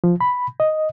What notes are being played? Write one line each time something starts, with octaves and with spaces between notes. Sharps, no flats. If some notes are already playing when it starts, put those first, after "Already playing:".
F3
B5
D#5